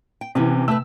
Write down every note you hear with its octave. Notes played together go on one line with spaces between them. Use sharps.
G5
C3 E3 B3 C#4 B4
A3 B4 E6